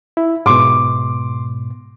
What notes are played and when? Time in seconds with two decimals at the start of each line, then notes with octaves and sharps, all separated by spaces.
0.17 E4
0.46 G#2 B2 C6 D6